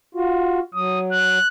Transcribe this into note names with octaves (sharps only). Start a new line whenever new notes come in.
F4 F#4
F#3 D#6
F#6